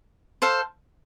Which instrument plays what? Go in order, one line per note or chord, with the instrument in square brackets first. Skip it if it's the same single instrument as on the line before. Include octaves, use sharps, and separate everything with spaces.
[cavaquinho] A4 C5 F5